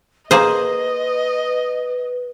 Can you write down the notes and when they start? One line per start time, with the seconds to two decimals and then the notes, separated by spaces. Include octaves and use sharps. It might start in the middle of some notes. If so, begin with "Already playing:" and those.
0.31 A#3 G#4 B4 C5 D#5